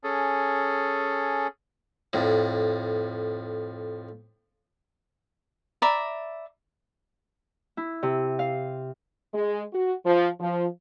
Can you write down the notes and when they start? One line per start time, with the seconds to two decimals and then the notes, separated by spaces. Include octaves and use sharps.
0.04 C#4 G#4 A4
2.13 F2 A2
5.82 D5 E5 A#5 B5
7.77 E4
8.03 C3
8.39 F5
9.34 G#3
9.73 F#4
10.05 F3
10.40 F3